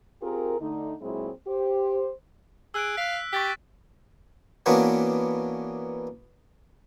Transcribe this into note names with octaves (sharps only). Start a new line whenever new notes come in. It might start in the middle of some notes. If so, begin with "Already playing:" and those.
C4 F4 G4 G#4 A#4
D3 A3 D#4
A#2 F#3 G#3 C4 E4 G#4
G4 C5
G#4 E6 F#6 D7
F5 F#6 B6
G4 C#6 A6 B6
E3 A#3 B3 C#4 D4 F#4